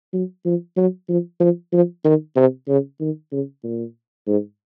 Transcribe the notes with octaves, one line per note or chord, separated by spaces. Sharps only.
F#3
F3
F#3
F3
F3
F3
D#3
C3
C#3
D#3
C#3
A#2
G#2